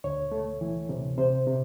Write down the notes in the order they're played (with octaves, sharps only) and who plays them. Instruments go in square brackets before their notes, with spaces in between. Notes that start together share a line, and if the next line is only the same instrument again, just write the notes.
[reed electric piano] D2 C#5
A3
E3
C3
C3 C5
C3